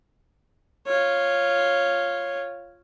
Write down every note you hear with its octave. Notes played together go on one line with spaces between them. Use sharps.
F4 C#5